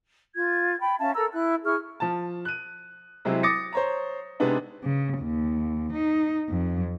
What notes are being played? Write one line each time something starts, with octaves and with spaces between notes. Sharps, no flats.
F4 G#6
G5 B5
C#4 E5 F5 A5
A4 A#4 A#5 E6
E4 F#6
E4 G#4 C#6 F6
F3 A5
F#6 D#7
C3 F#3 G#3 C4 E4
D6 D#6 A6 A#6 C#7
C5 C#5 A#5
C3 G#3 B3 D4 D#4
C#3
D#2
D#4
F2